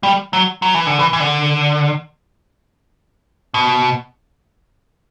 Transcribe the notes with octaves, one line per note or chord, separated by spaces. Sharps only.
G3
F#3
F#3
E3
D3
E3
E3
D3
B2